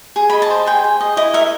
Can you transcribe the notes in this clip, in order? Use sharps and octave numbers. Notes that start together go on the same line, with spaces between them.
G#4
B5
D#5
A5
C5
G#4 G5
G#4
D#5
E4 D#5
A#4 E5